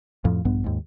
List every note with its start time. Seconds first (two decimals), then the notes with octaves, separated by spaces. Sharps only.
0.25 F2 A2 F3
0.45 A#1 G2 B3
0.64 D#2 G#2